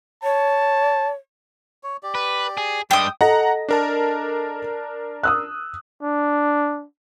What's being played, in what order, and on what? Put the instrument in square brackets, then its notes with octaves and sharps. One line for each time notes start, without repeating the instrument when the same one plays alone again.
[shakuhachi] C#5 [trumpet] A5
[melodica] C#5
G4 D5
[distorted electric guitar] B4
G#4
[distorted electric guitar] G2 G3 [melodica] G#3 E6 [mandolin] G5 D#6
[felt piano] A4 D#5 [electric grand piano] F#5 A#5 A#6
[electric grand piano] D4 A#4 A5
[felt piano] D#6 E6 F#6
[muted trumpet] D4